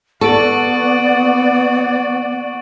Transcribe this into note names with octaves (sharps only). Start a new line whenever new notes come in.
B3 A4 D5 F#5 C#6 D7 F#7